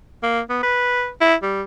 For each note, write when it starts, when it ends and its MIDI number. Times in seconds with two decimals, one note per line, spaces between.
0.23 0.40 58
0.50 0.62 59
0.63 1.09 71
1.21 1.35 64
1.42 1.62 55